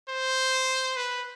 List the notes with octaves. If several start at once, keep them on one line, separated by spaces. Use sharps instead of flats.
C5
B4